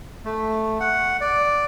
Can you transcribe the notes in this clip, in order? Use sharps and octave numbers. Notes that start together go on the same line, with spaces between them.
A3
F#5
D5